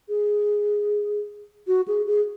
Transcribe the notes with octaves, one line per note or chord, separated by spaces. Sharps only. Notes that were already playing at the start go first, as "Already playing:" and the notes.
G#4
F#4
G#4
G#4